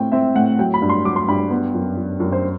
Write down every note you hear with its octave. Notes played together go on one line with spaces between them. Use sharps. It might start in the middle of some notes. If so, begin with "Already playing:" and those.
Already playing: A2 C4 G5
C4 E5
A2 F#5
F#3 G5
B5
G2
C6
F#3 D6
C6
G2 B5
B3
F#2
F#2
F#2
C5